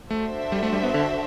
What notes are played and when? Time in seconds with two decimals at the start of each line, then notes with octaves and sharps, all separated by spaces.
0.10 A3 D4 F#4 A4 C5 E5
0.52 G3
0.63 A3
0.73 G3
0.83 B3
0.94 D3